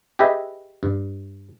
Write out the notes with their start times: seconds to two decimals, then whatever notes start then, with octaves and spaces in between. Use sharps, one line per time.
0.19 G4 G#4 B4 D#5 E5
0.83 G2